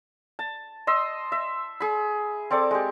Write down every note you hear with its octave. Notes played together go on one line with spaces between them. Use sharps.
A5
D#5 C6 E6
E5
G#4 B5
C4 A4 D5 D6
G#3 G4